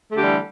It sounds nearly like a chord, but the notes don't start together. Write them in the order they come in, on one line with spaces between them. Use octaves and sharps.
A3 D3 G4 G3 E3